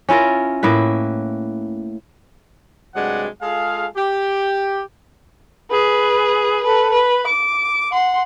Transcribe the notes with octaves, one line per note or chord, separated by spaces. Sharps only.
C#4 E4 F4 A#4
A2 A#3 E4 B4
G2 C3 F#3 G#3 D5 F#5
G#3 F4 G#4 A4 F5
G4
G#4 B4
A4 B4
B4
D6
F#5 C6